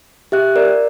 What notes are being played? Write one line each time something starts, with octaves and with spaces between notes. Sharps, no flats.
G4 E5 F#6
A#4 D5